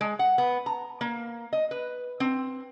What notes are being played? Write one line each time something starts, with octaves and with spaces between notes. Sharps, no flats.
G#3
F#5
B3
A#5
A#3
D#5
B4
C4